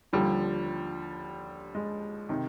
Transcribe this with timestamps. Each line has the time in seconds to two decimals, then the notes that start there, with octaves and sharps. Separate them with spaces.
0.13 D#2 D3 F3 G3
1.75 G#3
2.29 C3 D#3